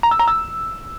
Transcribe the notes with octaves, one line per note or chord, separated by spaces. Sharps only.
A#5
E6
A#5
E6